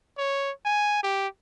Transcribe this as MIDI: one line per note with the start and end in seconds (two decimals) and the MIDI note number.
0.18 0.51 73
0.66 1.02 80
1.03 1.27 67